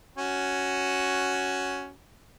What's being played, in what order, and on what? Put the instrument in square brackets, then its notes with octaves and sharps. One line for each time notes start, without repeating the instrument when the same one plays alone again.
[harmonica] C#4 F#4